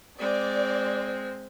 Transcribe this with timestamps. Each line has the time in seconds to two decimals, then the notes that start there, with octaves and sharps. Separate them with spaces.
0.19 G#3 C4 D5